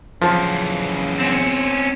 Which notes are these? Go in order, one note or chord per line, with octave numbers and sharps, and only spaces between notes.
F#2 C#3 E3 F3
C4 C#4